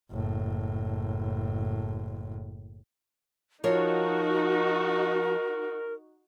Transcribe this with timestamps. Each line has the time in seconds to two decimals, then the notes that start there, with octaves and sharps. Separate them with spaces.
0.11 F#1 A2
3.64 F3 D#4 F#4 A#4 C#5